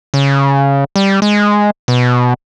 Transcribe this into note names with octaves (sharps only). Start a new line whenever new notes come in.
C#3
G3
G#3
B2